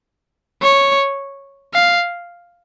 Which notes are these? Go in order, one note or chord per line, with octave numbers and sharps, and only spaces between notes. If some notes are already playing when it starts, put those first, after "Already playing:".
C#5
F5